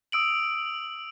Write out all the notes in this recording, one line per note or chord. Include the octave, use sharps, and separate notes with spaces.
D#6 E6 D7 F#7